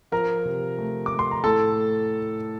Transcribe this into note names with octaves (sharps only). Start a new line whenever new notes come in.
F3 A#4 A#5
C3
A3
D6
A3
C6
A#5
A2 A4 A5